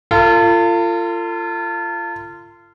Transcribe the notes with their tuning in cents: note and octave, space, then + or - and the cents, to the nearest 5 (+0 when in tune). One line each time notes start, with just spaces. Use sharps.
F4 -25 A4 +40